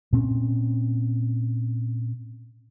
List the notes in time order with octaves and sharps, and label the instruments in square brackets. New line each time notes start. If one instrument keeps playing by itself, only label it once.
[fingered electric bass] A#2 C4 C#4